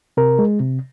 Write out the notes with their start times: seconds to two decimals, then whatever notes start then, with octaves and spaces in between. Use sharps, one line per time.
0.17 C3 A#4
0.39 G#3
0.60 C3